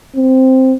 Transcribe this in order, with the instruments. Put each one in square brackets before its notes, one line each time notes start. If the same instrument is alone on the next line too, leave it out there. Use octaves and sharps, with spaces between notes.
[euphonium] C4